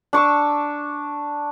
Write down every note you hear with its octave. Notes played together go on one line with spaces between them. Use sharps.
D4 C#6 D6 E6